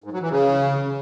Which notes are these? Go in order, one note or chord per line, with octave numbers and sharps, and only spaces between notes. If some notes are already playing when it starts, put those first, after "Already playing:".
G#2
F#3
E3
C#3